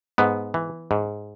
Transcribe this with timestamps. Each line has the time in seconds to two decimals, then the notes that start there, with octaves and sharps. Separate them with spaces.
0.18 G#2 B3
0.54 E3
0.91 G#2